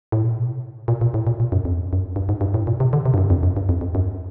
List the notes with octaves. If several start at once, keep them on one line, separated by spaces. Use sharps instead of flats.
A2
A#2
B2
C3
A#2
A#2
A2
A#2
A#2
F#2
F2
F#2
F2
G2
G#2
G2
A2
A#2
C3
D3
C3
G2
F#2
F2
F#2
G2
F2
F2
F#2